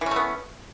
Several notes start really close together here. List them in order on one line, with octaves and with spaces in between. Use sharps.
E3 C#4 A3 B3